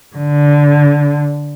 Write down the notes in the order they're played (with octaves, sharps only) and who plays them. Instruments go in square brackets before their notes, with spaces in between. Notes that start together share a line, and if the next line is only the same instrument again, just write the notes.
[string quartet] D3